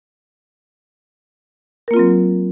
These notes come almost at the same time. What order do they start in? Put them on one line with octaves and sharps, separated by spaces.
A#4 A#3 F4 C4 F#3